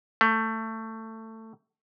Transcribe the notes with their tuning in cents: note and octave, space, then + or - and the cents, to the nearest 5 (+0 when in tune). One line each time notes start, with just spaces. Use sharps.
A3 +20